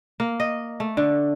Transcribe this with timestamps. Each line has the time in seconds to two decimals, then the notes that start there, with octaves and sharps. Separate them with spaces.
0.20 A#3
0.40 D#5
0.80 A3
0.97 D3